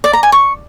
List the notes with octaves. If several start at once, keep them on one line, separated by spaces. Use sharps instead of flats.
D5
A#5
G#5
C#6